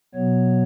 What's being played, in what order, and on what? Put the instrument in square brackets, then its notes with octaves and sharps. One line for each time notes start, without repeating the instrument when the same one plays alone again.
[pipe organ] B2 F#3 B3 C#5